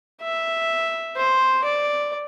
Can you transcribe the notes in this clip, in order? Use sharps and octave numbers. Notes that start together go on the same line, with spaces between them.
E5
C5
D5